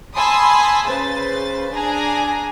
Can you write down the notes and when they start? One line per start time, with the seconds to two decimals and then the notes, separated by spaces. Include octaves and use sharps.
0.16 G#5 A5 B5 C6 D#6 E6
0.87 C#3 B4 C5 A6
1.73 D4 G#4 G#5 A#5